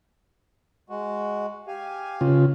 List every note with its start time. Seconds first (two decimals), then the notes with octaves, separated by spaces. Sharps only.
0.90 G#3 F#4
1.67 G4 F5 G#5
2.21 C#3 F4